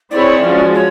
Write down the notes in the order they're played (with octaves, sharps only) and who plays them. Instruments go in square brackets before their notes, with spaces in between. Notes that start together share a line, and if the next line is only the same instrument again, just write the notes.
[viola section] C4 E4 G#4 C#5 [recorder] D5
[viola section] F3 G#3 C#4 F#4
[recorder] C#5